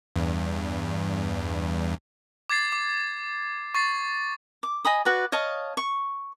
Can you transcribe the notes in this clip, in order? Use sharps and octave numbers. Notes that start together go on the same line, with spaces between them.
E2 G2
D6 G#6 A6 C7
D6
C#6 A6 C7
D6
D#5 G#5 B5 D#6
F#4 B4 D5
C#5 D#5 F5 A5
C#6